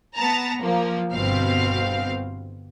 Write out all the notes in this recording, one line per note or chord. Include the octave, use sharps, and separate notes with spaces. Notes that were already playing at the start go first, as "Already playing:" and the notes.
B3 A5 A#5
F3 A#3
G1 B2 C4 F5